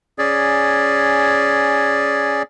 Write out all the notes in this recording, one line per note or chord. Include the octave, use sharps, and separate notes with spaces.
C#4 G#4 D5